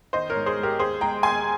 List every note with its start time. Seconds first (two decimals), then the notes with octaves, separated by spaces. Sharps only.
0.13 D#3 C5 D#5
0.30 A#4 C#5
0.36 G#2
0.46 G#4 C5
0.58 G#3
0.63 G4 A#4
0.79 D#2 G#4 C5
1.01 G#3 G5 A#5
1.23 D#2 G#5 C6